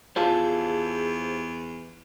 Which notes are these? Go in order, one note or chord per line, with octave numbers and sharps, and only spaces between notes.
E2 F4 G4 G#4 C5 A5